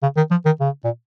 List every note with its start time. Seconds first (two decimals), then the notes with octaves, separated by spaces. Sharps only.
0.02 C#3
0.17 D#3
0.31 F3
0.46 D#3
0.60 C#3
0.85 A#2